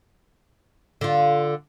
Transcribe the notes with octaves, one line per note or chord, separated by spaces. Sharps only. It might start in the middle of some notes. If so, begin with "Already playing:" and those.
D3 F4